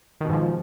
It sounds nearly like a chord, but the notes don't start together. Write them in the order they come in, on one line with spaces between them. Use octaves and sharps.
D#3 B2 G#2 F3